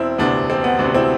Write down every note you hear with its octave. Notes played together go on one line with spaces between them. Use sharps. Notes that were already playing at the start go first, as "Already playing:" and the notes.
Already playing: E1 C4 E4
D2 C3 B3 D4
E1 C4
B3
D2 C3 D4 F#4
C4 E4